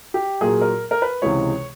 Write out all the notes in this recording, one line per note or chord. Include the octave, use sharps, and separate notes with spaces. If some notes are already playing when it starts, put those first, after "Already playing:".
G4
A#2 F#3 A#3 G#4
A#4
A#4
B4
C#2 C3 E3 G#3 C#5